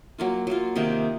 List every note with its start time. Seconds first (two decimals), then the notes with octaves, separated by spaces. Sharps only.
0.18 F#3 A#3 F4
0.47 F#3 A#3 F4
0.76 C3 D#3 A#3 D#4